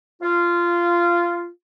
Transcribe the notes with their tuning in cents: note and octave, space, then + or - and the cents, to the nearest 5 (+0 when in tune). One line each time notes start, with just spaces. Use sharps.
F4 -15